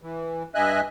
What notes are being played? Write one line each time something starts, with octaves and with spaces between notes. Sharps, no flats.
E3
G2 D#5 E5 G#5 F#6